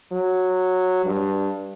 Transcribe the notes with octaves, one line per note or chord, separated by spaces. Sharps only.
F#3
G2